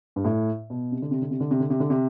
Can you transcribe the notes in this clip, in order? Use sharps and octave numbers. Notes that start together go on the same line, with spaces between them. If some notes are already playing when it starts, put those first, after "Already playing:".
G2
A2
B2
C3
D3
C3
D3
C3
D3
C3
D3
C3
D3
C3